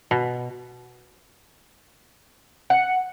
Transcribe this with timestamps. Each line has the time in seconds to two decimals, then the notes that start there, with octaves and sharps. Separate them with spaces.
0.11 B2
2.70 F#5